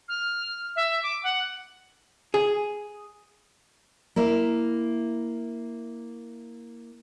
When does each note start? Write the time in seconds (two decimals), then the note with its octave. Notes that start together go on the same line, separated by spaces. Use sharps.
0.09 F6
0.76 E5
1.03 D6
1.23 F#5
2.34 G#4
4.16 A#3 E4 E5